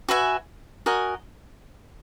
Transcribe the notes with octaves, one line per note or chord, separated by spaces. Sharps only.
F#4 B4 E5 G#5
F#4 A#4 D#5 G#5